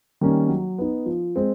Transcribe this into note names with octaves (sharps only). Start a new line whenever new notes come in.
D#3 G3 A#3 C#4
F#3
B3 D#4
F3
G#3 C4